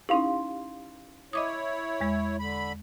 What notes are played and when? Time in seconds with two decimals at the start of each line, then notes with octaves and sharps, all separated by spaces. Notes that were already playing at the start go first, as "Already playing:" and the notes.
0.09 C#4 D#4 E4 G4 F5 C6
1.33 E4 C#5 D#5 D6 D#6
2.01 E2 G#3
2.40 D3 B5